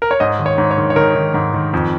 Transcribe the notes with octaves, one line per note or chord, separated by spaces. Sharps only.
A#4
C#5
G#2 D#5
D#3
C#5
G#2
C#5
D#3
C#5
D#3 A#4
D#3
G#2
D#3
F2